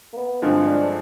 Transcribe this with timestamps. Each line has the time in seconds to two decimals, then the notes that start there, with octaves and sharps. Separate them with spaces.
0.13 A#3
0.17 B3
0.42 G2 D3 F3 G#3 C4
0.67 D4